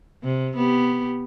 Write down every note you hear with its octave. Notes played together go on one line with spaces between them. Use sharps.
C3
B3 G4